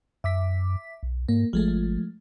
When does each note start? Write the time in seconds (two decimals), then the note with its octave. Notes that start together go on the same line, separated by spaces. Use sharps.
0.24 F#2 E5 D6 B6
1.03 B1
1.29 G#2 A#3
1.53 G#1 F3 G#3 A3